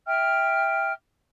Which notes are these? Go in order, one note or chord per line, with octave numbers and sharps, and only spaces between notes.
E5 G5 F6